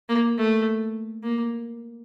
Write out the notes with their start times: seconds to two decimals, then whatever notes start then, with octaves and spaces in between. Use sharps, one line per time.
0.09 A#3
0.37 A3
1.23 A#3